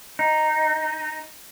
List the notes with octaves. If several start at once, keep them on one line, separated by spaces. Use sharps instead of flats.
D#4